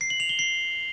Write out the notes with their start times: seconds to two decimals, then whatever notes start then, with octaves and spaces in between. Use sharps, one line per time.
0.01 C7
0.10 F#7
0.20 F7
0.29 G7
0.39 C7